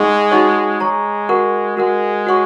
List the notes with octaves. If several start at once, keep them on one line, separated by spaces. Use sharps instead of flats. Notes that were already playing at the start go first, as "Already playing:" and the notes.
Already playing: G#3 D#4 G#4 D#5 F#5 C#6
D#4 F#4 C#5 F#5 C#6
G#3 C#5 A#5 C#6
F#4 A#4 F#5 C#6
G#3 F#4 A#4 F#5
F#4 C#5 F#5 C#6